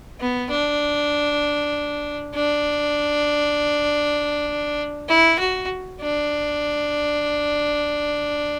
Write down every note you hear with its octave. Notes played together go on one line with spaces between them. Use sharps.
B3
D4
D4
E4
F#4
D4